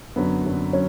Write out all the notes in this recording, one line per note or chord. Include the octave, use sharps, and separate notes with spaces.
F#2 D3 F#3 B3
F#2 D3 F#3
F#3 C#4